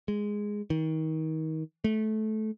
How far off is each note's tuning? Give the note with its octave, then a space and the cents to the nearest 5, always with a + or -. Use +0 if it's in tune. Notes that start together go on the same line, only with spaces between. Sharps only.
G#3 -5
D#3 +30
A3 -20